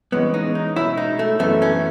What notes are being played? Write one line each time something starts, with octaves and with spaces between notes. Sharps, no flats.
E3 G#3 B3 C#4
D#4
D#4
B2 G#3 C#4 E4 F#4 C#5
D#4
A3
F#2 E3 A3 B3 E4 A4
C#4